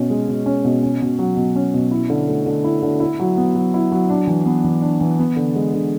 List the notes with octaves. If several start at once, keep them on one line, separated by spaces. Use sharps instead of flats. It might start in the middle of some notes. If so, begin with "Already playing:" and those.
Already playing: B2 C#4
G#3
B2
C#4
B2
C#4
B2
F#3
B2
C#4
B2
E4
D3
A3
D3
E4
D3
E4
F#3
B3
F#3
E4
F#3
D4
E3
B3
E3
D4
E3
B3
D3
G#3
D3